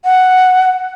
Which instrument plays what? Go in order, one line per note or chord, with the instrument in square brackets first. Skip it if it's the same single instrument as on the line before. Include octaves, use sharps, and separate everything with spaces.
[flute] F#5